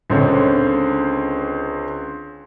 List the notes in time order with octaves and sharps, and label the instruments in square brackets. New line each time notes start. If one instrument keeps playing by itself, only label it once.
[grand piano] C#2 D3 C4 C#5